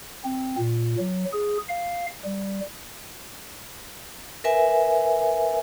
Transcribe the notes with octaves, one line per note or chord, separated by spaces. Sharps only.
C4
A#2
F#3
G#4
F5
G3
A#4 B4 E5 G#5